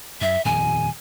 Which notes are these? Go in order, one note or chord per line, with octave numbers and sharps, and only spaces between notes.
F#2 E5
D#1 F2 G#5